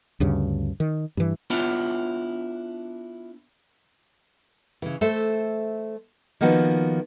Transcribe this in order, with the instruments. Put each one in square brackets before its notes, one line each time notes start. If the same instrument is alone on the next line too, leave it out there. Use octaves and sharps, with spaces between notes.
[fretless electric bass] D2 G2 C#3
D#3
G2 E3
[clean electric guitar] B3 D4 E4 F4 B4 C#5
[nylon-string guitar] C#3 E3
A3 A4 C5 E5
D#3 F3 A#3 B3 F#4